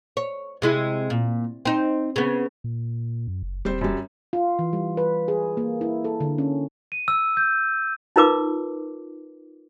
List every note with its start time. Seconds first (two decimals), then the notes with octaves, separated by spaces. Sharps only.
0.17 C#5
0.62 C3 G#3 E4
1.10 A#2
1.65 C4 D#4
2.16 C#3 B3
2.64 A#2
3.27 F#2
3.43 F#1
3.65 E1 G3 C4 C5
3.81 F#2 G3
4.33 F4
4.59 E3
4.73 G3
4.97 B4
5.28 G#4
5.57 A#3
5.81 E4
6.05 A4
6.20 D3
6.38 C#4
6.92 D#7
7.08 E6
7.37 G6
8.16 D#4 F4 A#4 B4 D6